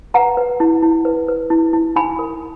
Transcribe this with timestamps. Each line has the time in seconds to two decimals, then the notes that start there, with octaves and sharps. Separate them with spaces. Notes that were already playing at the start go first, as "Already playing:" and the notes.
0.14 B4 F#5 A#5
0.37 B4
0.60 E4
0.82 E4
1.05 B4
1.28 B4
1.50 E4
1.73 E4
1.96 D#4 G#5 B5
2.19 A#4